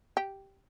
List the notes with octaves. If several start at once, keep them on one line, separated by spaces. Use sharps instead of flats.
G4